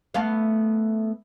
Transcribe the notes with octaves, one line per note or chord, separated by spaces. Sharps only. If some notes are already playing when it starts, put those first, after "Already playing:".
A3 B3 F5